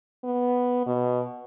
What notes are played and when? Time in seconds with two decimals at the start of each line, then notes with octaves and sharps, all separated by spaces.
0.24 B3
0.86 B2